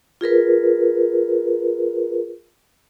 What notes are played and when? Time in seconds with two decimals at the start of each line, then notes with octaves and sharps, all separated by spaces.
0.21 F4 G#4 A#4 B4